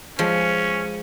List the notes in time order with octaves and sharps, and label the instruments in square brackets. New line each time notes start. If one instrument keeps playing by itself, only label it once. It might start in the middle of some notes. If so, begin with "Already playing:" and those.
[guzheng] F3 G#3 [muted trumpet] C#4